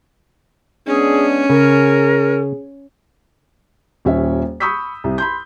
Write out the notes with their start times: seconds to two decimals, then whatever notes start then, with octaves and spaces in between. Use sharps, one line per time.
0.87 G#3 B3 C#4 D4 G#4
1.50 C#3 G#4 A#4
4.05 D#1 D#2 C#4 E5
4.60 B5 C#6 D#6 E6 G6 B6
5.04 C2
5.18 B5 C6 G6